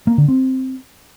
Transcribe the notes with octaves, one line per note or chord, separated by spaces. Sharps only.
A#3
D3
C4